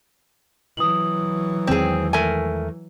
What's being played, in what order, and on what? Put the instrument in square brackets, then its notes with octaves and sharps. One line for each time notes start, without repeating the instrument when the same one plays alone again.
[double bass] E3 F#3 [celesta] D#6 F#7
[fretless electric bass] E2 D#3 G#3 [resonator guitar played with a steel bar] C4 G#4
[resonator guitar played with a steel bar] A3 A#4 G#5